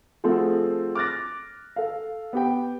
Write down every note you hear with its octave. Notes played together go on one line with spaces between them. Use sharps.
F3 A3 C4 F#4 G#4 A4
D6 F6 F#6 A6 A#6
A4 F5
B3 G4 G5